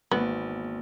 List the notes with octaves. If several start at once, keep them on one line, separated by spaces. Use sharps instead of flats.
G#1 E2 A#3 B3